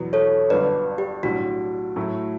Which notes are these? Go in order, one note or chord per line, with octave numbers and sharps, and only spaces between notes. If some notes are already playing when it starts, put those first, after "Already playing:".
Already playing: E2 B2 F#3 B3
A4 C#5
G1 G2 F#3 B3 D4 B4 D5
G4
B1 A2 G3 D4 F#4
A2 F#3 A3 E4